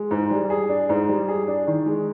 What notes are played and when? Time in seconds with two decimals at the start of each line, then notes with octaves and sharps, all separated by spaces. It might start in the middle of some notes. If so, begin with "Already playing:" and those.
Already playing: G#3
0.11 G#2
0.31 G3
0.50 G#4
0.69 D4
0.89 G#2
1.09 G3
1.28 G#4
1.48 D4
1.67 D#3
1.86 G#3